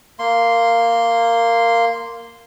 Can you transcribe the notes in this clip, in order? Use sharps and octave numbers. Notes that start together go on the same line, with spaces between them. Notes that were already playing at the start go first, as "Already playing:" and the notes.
A#3 C6